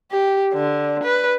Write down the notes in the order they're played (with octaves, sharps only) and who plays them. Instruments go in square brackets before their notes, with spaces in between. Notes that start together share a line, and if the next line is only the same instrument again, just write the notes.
[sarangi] G4
D3
B4